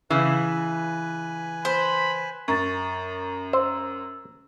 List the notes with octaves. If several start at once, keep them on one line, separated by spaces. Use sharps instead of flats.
C#3 E3 B4 G#5
C5 B5
F#2 C#6 A6
C5 E6